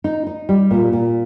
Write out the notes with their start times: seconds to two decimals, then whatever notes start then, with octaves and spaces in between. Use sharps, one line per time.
0.04 D#4
0.27 D#4
0.49 G3
0.71 A#2
0.93 A#2